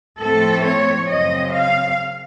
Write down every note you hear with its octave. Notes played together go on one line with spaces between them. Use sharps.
A2 F3 A3 C4 A4
C#5
F#2 C#3 F#3 C4 D#5
F5